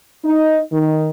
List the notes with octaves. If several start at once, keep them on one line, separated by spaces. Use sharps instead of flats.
D#4
D#3